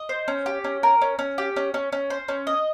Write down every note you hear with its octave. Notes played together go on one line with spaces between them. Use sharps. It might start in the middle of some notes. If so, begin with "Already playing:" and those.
Already playing: D#5
C5
C#4
G4
C#4
A#4
C#4
C#4
G4
C#4
C#4
C#4
C5
C#4
D#5